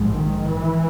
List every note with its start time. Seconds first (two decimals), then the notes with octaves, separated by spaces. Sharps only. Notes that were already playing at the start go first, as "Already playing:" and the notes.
Already playing: A#1 G#2
0.11 D#3
0.47 E3